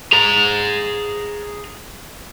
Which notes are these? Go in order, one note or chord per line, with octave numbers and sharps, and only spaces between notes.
G#4 A#5